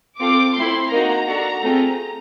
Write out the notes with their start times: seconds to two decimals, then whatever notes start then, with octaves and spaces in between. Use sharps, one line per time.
0.19 C4 F4 A4 D6
0.55 A3 C4 E4 C6
0.91 A#3 D#4 F#4 A#5
1.27 D4 F#4 A4
1.62 A3 C4 F4 G#4